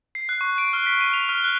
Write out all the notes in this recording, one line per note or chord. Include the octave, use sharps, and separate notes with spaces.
C7
F#6
C#6
D7
F6
B6
D#7
F7
F6
F#6